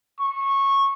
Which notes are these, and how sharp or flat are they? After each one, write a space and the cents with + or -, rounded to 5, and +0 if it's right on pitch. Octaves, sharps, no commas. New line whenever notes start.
C#6 -15